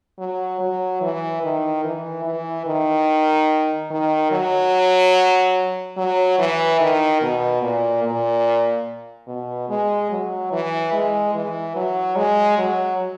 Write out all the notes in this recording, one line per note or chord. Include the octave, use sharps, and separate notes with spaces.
F#3
F#3
E3
D#3
E3
E3
D#3
D#3
F#3
F#3
E3
D#3
B2
A#2
A#2
B2
G#3
F#3
E3
G#3
E3
F#3
G#3
F#3